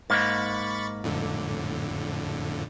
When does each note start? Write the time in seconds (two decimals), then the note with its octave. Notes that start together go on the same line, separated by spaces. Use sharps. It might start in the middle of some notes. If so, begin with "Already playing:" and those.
0.10 G#2 A#3 B5 C#6 A6
1.04 F2 A2 D3